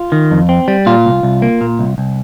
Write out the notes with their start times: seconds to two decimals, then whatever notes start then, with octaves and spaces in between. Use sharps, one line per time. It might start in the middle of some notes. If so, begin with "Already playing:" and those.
Already playing: F4
0.12 D#3
0.31 F2
0.49 C4
0.68 G3
0.86 A#2 F4
1.05 C2
1.23 C2
1.42 A#3
1.61 A#2
1.79 C2
1.98 C2